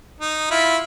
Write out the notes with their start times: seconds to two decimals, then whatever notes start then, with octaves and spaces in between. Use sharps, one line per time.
0.20 D#4
0.51 E4 F4